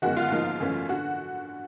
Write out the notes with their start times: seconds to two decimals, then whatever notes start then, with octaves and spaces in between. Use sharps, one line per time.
0.02 G1 F#2 D#3 G#3 B3 F#4
0.17 F4
0.31 G#2 F3 A#3 D#4
0.60 F#2 C#3 E3 A3 C#4
0.89 D3 F#4